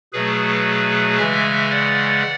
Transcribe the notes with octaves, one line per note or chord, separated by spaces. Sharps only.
B2 F#3 A3 G#4 B4
C#3 E3 G#3 E5 G#5
D5 F#5